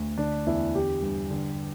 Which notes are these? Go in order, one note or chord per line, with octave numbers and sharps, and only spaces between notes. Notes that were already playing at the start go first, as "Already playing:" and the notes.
Already playing: D2
D3 D4
E2 E4
D3 G4
G2
D3